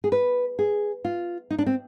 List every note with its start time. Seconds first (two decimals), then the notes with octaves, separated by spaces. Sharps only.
0.04 G#4
0.12 B4
0.59 G#4
1.05 F4
1.50 D#4
1.59 D4
1.66 C4